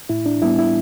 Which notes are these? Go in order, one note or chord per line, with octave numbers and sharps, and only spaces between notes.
A2 E4
D4
G3 B3 E4
E4